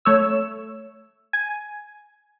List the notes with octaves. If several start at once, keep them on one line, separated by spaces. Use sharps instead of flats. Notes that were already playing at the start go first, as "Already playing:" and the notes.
A3 C#5 E6
G#5